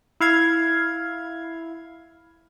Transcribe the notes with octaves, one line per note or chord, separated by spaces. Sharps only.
E4 F5 G#6